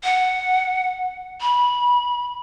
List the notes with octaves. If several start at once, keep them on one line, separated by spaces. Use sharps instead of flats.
F#5
B5